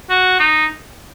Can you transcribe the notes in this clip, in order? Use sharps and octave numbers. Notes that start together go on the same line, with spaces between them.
F#4
D#4